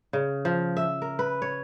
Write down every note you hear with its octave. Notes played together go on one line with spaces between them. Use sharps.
C#3
F3
E5
A#4
B4
C#5